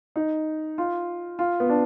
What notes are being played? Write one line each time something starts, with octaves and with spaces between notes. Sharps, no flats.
D#4
F4
F4
B3
D4